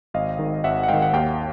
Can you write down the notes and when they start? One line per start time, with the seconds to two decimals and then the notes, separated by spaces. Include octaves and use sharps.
0.14 G#1 D#5 F5
0.39 G#2 D#3
0.64 G#1 E5 F#5
0.83 F#5
0.88 G#2 D#3 F5 G5
1.02 F#5
1.13 D#2 F5 G5